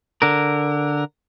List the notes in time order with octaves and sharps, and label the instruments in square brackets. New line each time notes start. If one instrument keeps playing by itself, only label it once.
[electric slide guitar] D3 A#4